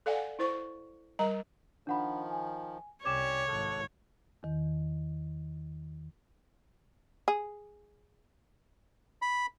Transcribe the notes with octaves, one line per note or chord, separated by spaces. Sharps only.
A4 D5 F5 F#5 G#5
E4 C5 C#6
G3 A#4 A#5
D#3 F3 D4 F#5 B5
G#5
C2 C#4 G4 C#5 D5 D6 G#6 E7
G#1 A4 F#5
E2 D#3
G#4
B5